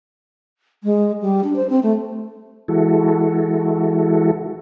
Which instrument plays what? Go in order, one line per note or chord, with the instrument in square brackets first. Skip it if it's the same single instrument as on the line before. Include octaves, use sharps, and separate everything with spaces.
[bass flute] G#3
G3
D4
C5
C4
A3
[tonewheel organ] E3 G#3 E4 F#4 A4